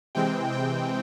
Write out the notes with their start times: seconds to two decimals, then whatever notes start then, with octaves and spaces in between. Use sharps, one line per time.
0.15 C3 E3 G#3 C4 G5
0.52 G5